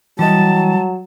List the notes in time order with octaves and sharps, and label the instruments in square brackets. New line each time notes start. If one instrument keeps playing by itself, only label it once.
[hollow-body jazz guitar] E3 D#5 [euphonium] F#3 [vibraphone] G3 [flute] A5